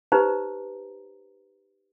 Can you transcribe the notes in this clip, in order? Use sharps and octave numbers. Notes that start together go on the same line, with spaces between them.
D#4 G4 B4 C5 A#5